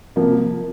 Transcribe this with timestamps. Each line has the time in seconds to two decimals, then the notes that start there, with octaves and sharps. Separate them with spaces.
0.16 C3 F3 A#3